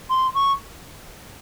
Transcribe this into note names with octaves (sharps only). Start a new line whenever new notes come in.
C6
C#6